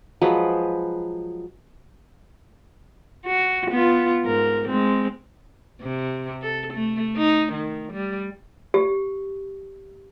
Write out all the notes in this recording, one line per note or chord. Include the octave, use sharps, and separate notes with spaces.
F3 F#3 G#3 B4
F#4
B3 F4
G#2 A#4
G#3 C4
C3
A4
A3
D#4
D#3
G3
G4